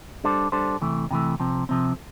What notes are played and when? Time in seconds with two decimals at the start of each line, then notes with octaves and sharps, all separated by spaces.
0.24 G3 D4 A4 C5
0.52 G3 D4 A4 C5
0.82 C3 E3 A3
1.11 C3 E3 A3
1.40 C3 F3 C4
1.69 C3 F3 C4